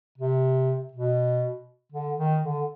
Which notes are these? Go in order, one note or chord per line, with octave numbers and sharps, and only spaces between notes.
C3
B2
D3
D#3
D3